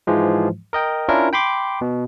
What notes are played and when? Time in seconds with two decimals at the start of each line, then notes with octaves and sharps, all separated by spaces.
0.07 G#2 E3 F3 G#3
0.73 A#4 D#5 G5
1.09 C#4 D4 E4 F4 A#4
1.33 G5 B5 C6 D6
1.81 B2